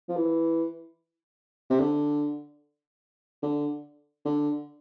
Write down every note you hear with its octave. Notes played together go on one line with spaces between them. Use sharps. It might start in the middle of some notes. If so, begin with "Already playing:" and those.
F3
E3
C3
D3
D3
D3